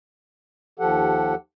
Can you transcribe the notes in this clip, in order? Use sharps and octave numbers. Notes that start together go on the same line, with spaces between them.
D#2 F3 G4 A4 F#5